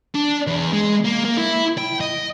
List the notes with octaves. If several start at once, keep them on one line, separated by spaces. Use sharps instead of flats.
D4
E2
G#3
A#3
A#3
E4
G5
D#5